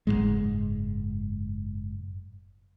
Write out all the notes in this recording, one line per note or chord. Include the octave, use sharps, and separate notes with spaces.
F#1 E2 G#2 G#3